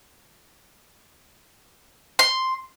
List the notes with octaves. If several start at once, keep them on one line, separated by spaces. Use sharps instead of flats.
C6